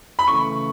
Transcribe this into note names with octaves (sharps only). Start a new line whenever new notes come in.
B5
C#3 E3 A3 C#6